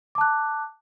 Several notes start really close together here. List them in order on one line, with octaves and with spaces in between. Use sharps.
D6 A5 F#6